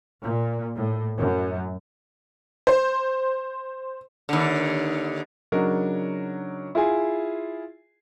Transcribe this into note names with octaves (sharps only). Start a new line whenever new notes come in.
A#2
A2
F#2
C5
D#2 D3
C#3 F#3 D4 D#4 A#4
E4 F4 G#4 G#5